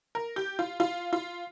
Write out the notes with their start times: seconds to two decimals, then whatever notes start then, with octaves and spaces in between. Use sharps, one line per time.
0.15 A#4
0.36 G4
0.59 F4
0.80 F4
1.13 F4